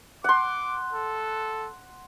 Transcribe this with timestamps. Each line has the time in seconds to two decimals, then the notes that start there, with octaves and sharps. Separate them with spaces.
0.24 F#5 C6 D6
0.92 A4